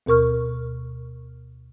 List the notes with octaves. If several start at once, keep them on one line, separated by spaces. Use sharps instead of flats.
D2 B2 A#4 C#6 F6